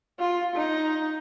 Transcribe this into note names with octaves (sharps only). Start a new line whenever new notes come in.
F4
D#4